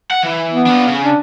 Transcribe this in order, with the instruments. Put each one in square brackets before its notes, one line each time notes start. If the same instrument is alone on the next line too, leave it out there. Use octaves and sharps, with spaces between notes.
[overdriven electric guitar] F#5
E3
[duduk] B3
[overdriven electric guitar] D4 F4
C#3
[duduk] D4